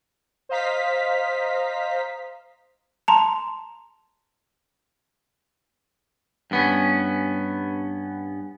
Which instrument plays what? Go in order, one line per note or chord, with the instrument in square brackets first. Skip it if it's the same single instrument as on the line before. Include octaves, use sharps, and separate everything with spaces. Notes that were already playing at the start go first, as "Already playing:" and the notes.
[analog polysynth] C5 D#5 F5 A#5 B6
[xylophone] A5 A#5 C6
[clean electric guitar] G2 B3 C#4